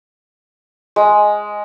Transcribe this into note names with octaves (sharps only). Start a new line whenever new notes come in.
G#3